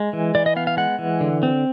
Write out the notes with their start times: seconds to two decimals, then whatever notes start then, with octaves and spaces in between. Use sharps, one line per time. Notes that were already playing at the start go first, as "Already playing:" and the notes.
Already playing: G#3
0.13 E3
0.35 E3 D5
0.46 D#5
0.56 B3 F5
0.67 F5
0.77 G#3 F#5
0.99 E3
1.21 D3
1.43 C4